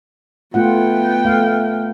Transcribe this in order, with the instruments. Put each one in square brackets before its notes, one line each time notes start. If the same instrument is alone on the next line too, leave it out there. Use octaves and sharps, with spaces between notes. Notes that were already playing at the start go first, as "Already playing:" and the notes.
[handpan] A3 F4 F#5 [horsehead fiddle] B3 G5
[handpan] A3 F5